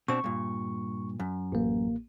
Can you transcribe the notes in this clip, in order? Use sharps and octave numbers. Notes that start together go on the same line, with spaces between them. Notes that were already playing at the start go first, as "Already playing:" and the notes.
B2 C4 D4 C#6
G2 A#2
F#2
A1 A#3